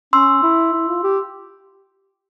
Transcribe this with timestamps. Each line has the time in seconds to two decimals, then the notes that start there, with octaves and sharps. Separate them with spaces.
0.13 C#4 C6 E6
0.43 E4
0.73 E4
0.88 F4
1.03 G4